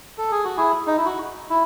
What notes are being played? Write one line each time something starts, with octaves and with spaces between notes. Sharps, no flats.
A4
G#4
F#4
E4 G#4
D#4
E4
F#4
E4